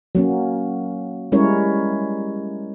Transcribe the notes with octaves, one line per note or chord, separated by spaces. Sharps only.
F#3 A#3 C#4
G3 G#3 C#4 E4 A#4 C#5